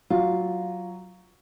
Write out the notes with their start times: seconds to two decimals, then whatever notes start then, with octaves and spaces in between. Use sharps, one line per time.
0.10 F#3 F4